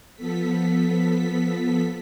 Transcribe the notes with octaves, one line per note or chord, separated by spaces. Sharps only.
F3 B3 A4 B6